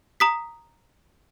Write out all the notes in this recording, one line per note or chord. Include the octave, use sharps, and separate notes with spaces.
A#5 D#6 B6